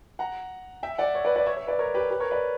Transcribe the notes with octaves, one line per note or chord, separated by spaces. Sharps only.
F#5 A#5
E5 G5
D5 F#5
C#5 E5
B4 D5
B4 D5
C#5 E5
C#5 E5
B4 D5
A#4 C#5
G4 B4
G4 B4
A#4 C#5
B4 D5